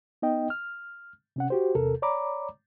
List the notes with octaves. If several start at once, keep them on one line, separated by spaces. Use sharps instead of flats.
B3 D#4 D#5 G5
F6
C3 C#4 F#5
F#4 G4 C5
E2 C3 A4 A#4
C#5 D5 A#5 B5 D6